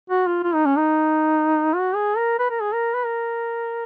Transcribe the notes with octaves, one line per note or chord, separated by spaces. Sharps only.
F#4
F4
F4
D#4
C#4
D#4
F#4
G#4
A#4
B4
A#4
G#4
A#4
B4
A#4